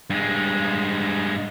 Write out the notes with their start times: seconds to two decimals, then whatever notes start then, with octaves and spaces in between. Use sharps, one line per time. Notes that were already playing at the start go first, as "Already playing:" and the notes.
0.10 G2 G#3